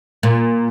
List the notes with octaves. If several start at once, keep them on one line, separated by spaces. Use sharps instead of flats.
A#2